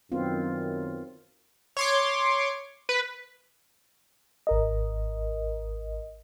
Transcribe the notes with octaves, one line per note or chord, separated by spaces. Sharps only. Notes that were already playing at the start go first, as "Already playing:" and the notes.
F#2 D#3 B3 C4 F4
C#5 C6 D6
B4
G#1 A#4 D#5